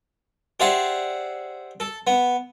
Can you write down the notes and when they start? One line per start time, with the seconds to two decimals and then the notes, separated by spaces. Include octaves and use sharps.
0.60 G4 G#4 C5 D5 E5 F#5
1.80 A4
2.07 B3